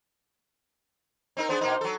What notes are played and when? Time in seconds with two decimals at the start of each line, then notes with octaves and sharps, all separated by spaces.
1.37 C4 D#4 A#4
1.49 B3 D4 G#4 C5
1.61 B2 A#3 D#4
1.81 F#3 A4